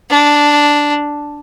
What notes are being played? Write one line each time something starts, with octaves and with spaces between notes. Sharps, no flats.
D4